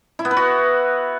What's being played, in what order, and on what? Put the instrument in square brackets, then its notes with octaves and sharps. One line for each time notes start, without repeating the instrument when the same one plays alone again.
[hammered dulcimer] E4
B3
B4
F#4